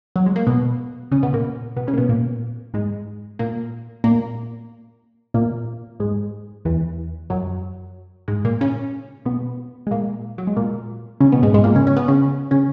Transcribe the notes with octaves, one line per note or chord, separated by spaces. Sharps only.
F#3
G#3
A#3
B2 B3
C#3 C#4
B2 B3
A#2 A#3
B2 B3
C#3 C#4
A#3
B2 B3
A#2 A#3
G#2 G#3
A#2 A#3
A#2 A#3
A#2 A#3
G#2 G#3
E2 E3
F#2 F#3
G#2 G#3
A#2 A#3
C#3 C#4
B2 B3
G#3
A#2 A#3
F#3
G#3
A#2 A#3
C#3 C#4
B2 B3
G#2 G#3
G#2 G#3
A#2 A#3
C#3 C#4
C#4
B3
C#3 C#4
C#3 C#4